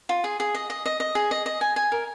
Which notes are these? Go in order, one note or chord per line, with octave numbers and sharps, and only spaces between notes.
F4
G#4
G#4
D#5
D#5
D#5
D#5
G#4
D#5
D#5
G#5
G#5
A#4